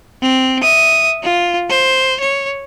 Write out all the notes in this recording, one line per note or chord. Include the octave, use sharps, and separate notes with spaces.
C4
E5 D#6
F4
C5
C#5